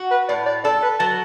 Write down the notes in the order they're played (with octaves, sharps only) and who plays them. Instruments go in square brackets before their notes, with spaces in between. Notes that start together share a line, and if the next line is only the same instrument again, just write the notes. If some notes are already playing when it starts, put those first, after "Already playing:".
Already playing: [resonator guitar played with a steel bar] F#4
[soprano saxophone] B4
[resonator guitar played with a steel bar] A2 [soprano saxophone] D5
[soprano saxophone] D5
[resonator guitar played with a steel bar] A4 [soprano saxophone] D5
[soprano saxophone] B4
[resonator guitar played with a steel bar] F#3 [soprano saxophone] A5